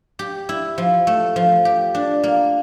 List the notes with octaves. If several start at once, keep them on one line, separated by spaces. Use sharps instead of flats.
G4
E4
F3
A3
F3
G4
D4
A#3